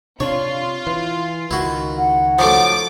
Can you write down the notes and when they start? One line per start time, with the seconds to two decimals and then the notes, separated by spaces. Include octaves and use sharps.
0.20 C3 D4 F4 C#5
0.87 E3
1.51 C#2 D#3 E4 F#4
1.98 F#5
2.39 F3 F#3 A3 D6